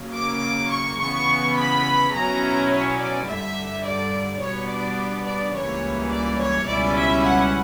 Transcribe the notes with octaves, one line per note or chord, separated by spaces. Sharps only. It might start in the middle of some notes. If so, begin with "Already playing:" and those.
Already playing: C#3 F#3 A#3
D6
C#6
C#3 E3 B3 C#6
B5
B2 F#3 C#4 E4 A#5
C#5
D5
G2 D3 G3 E5
D5
B2 G3 B3 D4 C#5
D5
D5
C#2 C#3 E3 G3 A#3 C#5
D5
C#5
C#2 B2 G3 C#4 E4 D5
E5
F#5